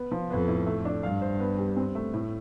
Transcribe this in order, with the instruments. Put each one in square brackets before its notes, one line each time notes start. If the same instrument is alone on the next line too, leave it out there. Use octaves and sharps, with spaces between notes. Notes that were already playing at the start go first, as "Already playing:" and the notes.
Already playing: [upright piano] B3
F3
[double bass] F2 [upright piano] B3
[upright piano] A2
A3
D4
[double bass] G2 [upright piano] F5
[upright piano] C5
B3
G3
C4
A3
A2